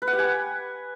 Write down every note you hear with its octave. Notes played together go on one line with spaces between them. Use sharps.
B4
F#5
G4
G#5